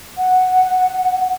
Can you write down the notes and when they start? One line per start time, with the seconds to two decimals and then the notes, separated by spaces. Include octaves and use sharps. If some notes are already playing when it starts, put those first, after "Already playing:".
0.17 F#5